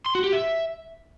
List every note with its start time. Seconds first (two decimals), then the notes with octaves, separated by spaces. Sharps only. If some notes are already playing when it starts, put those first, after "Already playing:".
0.06 C6
0.15 F#4
0.24 G4
0.33 E5